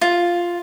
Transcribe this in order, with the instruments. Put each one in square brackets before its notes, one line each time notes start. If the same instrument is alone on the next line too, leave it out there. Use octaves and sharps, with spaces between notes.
[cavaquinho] F4